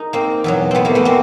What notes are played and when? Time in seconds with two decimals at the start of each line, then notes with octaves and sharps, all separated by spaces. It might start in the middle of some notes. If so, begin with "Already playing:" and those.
Already playing: D#4 G#4 A#4
0.13 A#3 C4
0.44 E2 B2 F#3
0.71 A3 B3 C4
0.85 G#3 A#3
0.95 A3 B3
1.05 A#3 C4